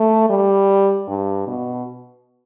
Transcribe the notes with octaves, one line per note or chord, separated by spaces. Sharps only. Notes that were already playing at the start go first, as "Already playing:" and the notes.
Already playing: A3
G3
G2
B2